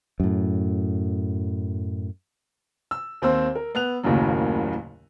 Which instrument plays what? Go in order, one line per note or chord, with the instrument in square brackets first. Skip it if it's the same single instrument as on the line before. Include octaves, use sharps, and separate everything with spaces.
[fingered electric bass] F#2 A2
[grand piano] E6
D#2 C4 C5 E6
A#4
B3 F#6 F7
F#1 D#2 A2 C#3 F#3